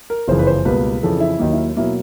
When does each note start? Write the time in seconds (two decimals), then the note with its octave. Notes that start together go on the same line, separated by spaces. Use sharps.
0.10 A#4
0.28 F#1 F2 C#3 E3 C5
0.39 B4
0.47 C5
0.65 C#2 B2 G3 A#3 B4
1.03 F2 C#3 E3 A4
1.20 E4
1.39 D#2 D#3 F#3 A#3 D#4
1.53 E4
1.77 B2 F#3 A#3 E4